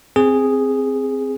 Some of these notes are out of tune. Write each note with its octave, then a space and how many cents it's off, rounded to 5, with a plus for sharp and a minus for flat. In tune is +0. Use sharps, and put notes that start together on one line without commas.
C4 +0 G#4 -5